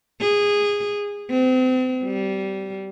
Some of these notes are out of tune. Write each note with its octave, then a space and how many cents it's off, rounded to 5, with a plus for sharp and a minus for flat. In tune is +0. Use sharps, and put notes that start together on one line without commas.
G#4 -15
C4 -35
G3 -20